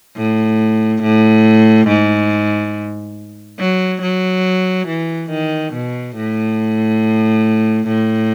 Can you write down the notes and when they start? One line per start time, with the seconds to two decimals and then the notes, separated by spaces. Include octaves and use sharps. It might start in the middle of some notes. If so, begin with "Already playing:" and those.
0.16 A2
1.02 A2
1.88 G#2
3.59 F#3
4.02 F#3
4.88 E3
5.30 D#3
5.73 B2
6.16 A2
7.87 A2